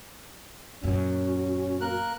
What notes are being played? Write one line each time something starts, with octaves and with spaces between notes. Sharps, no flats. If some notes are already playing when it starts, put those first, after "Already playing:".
F#2 A#2 C#4 F#4
A#3 A#4 F#6